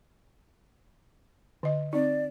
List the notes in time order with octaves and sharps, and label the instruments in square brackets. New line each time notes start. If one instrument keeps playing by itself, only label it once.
[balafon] D3 D#5
[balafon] C4 D#4 [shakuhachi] D5